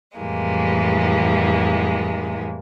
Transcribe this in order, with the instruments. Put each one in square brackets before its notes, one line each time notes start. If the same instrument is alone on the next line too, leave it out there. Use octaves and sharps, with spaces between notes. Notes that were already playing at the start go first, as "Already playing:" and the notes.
[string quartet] F2 A2 E3 G3 G#3 A#3